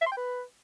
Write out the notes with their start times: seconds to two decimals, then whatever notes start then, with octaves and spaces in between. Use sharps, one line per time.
0.01 E5
0.06 C6
0.12 G5
0.17 B4